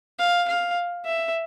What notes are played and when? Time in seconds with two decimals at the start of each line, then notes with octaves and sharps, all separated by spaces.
0.19 F5
0.48 F5
1.05 E5